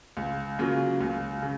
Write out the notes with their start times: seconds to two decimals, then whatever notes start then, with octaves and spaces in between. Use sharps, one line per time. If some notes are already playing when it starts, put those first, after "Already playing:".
0.17 C#2
0.59 C#3 F#3 A#3 F4
1.01 C#2
1.42 C#3